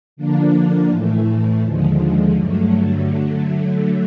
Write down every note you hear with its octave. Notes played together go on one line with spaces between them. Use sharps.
D3 F3 A#3 D4
A2 E3 A3
D#2 D3 F3 G#3
G2 D3 F#3 A3
D3 F#3 A3